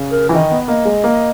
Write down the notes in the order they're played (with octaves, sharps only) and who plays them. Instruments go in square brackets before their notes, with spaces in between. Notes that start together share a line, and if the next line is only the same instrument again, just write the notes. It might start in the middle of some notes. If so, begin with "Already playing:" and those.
Already playing: [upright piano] C#3
[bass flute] A#4
[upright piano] E3
[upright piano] D#3 [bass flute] D#5
[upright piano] B3
[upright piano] A#3 [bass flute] D#5
[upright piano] G#3
A#3